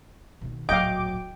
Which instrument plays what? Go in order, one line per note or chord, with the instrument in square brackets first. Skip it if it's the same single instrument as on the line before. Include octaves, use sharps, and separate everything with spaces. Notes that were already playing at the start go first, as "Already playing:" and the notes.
[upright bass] B2 D#3
[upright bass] D1 A#1 [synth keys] F#3 D6 [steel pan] D#5 F5 [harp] G5